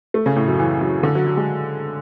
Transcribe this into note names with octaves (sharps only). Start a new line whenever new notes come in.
A3
C#3
A2
F#2
E3
F#3
D3
F#3
F#3
G#3